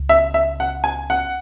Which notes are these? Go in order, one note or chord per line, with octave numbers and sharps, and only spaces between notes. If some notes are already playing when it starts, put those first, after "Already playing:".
Already playing: C#2
E5
E5
F#5
G#5
F#5